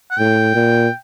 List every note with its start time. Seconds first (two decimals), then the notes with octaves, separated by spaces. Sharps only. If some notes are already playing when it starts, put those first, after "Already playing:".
0.11 F#5
0.18 A2 G5
0.55 A#2